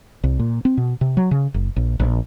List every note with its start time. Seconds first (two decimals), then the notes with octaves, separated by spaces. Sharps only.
0.24 C2
0.39 A#2
0.65 C4
0.77 B2
1.01 C3
1.17 F#3
1.31 C#3
1.54 F#1
1.76 A#1
2.00 A#1